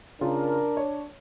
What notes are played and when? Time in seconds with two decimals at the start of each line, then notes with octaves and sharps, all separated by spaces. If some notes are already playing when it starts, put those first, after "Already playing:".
0.21 C#3 D4 F4 A#4
0.77 C#5